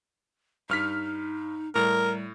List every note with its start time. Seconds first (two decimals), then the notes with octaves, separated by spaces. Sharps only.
0.69 G2 D#4 F6 B6
1.75 A2 G3 A#4